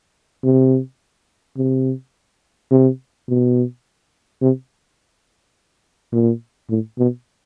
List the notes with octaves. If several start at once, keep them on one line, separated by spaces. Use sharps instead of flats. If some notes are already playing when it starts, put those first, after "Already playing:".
C3
C3
C3
B2
C3
A#2
A2
B2